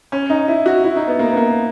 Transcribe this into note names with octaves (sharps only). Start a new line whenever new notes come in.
C#4
D#4
E4
F#4
E4
D#4
B3
A#3
B3
A#3